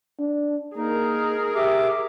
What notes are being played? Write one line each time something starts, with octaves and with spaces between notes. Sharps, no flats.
D4
A#3 D#4 G#4 A#4
G4 E5 D6